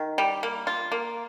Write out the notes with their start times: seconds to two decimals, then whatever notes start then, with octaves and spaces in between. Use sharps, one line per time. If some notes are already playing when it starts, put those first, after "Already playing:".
Already playing: D#3
0.18 G3
0.43 A#3
0.67 F4
0.92 A#3